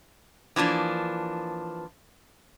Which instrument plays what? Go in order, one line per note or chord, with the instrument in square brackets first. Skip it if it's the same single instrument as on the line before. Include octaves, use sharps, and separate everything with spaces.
[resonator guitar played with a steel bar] E3 F3 A#3 D4